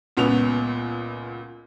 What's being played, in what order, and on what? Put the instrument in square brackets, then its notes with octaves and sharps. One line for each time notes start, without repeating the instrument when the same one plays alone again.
[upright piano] C#2 A#2 B3 C#4 F7